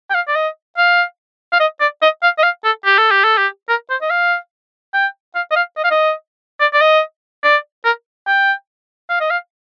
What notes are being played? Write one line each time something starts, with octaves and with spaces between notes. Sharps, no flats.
G5
F5
D5
D#5
F5
F5
D#5
D5
D#5
F5
D#5
F5
A4
G4
A4
G4
A4
G4
A#4
C5
D#5
F5
G5
F5
D#5
F5
D#5
F5
D#5
D5
D5
D#5
D5
A#4
G5
F5
D#5
F5